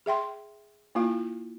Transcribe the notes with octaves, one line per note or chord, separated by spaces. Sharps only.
G#4 E5 G5 C6
A#3 E4 F4 F5